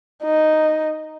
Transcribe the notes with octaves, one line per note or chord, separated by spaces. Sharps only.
D#4